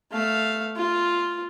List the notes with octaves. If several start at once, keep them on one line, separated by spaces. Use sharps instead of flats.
A3 F5
F4